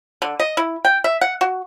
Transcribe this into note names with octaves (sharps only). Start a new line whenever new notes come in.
D3
D#5
E4
G5
E5
F#5
F#4